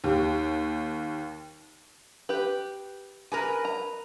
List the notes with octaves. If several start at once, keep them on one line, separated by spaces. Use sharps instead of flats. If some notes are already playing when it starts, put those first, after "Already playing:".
D#2 G4
G4 B4
A#4 B4 G#5
A#5